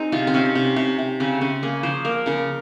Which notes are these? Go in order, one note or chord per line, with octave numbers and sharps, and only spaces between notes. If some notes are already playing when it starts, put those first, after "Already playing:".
Already playing: C4 D#4 G#4
C3 F4
C4
C3 C#4
C3
C3
C3
C#3 C4
C#3 C#4
A#3 G#4
F3 C5
A#3 A#4
C#3 A#4